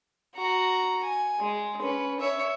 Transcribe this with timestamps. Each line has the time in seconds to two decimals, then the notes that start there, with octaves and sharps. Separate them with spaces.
0.36 F#4 A#5
1.03 G#5
1.40 G#3
1.81 C#4 B4
2.20 C#5 E5